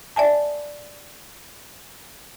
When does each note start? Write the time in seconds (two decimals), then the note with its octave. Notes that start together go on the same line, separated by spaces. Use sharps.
0.16 D5 E5 G#5 A5